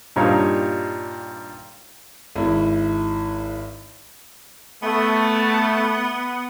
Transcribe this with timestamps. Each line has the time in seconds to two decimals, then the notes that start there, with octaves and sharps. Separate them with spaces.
0.16 G2 A#2 D#4 G4 C#5 F5
2.35 G#1 E4
4.83 A3 B3